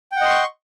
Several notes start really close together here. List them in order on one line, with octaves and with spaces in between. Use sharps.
G5 F#5 D#5 C6 C#6